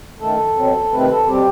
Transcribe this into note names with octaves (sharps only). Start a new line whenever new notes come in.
F#2 D#3 A3 A4
B2 F#3 C4
C3 D#3 A3 C4 B4
A4
B2 G3 C4 G4